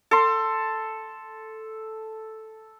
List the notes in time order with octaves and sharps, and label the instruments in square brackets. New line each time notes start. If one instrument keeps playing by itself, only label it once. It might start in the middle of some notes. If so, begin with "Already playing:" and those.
[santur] A4 C6